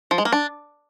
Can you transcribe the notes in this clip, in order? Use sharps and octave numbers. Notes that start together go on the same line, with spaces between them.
F3
G#3
A#3
D4